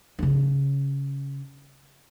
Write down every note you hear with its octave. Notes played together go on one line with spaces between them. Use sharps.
C#3 C#4